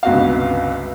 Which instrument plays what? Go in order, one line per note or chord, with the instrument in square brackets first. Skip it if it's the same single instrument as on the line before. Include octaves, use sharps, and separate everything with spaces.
[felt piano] G1 C#2 C3 B3 F#4 F5